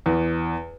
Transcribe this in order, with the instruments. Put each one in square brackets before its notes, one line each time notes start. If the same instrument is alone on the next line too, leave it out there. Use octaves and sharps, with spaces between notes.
[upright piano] E2